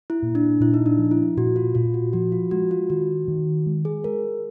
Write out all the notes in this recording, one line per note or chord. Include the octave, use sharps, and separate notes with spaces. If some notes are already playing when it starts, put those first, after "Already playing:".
E4
A#2
D4
A#2 E4
D#4
D4
F3
E4
A#2 F#4
F4
A#2 F4
F#4
F3 F#4
F4
G#3 F#4
F4
D#3 F#4
D#3
G#3
G#4
G#3 A#4